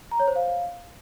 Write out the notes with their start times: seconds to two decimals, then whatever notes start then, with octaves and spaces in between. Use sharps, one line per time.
0.11 A#5
0.20 C#5
0.28 C5
0.36 F5